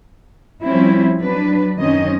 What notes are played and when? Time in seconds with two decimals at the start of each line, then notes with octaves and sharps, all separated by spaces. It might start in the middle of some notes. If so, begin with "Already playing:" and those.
0.64 F3 G3 C4 C#4 E4
1.20 F#3 D4 B4
1.78 F#2 D#3 C4 C#4 D#5